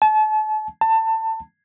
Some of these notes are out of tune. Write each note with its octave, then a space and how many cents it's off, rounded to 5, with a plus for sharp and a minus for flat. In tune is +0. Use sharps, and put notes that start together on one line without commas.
A5 -35
A5 +25